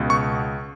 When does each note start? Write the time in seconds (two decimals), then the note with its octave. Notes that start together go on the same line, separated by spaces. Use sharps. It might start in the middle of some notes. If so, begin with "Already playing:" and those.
Already playing: C#2 B2
0.10 C#6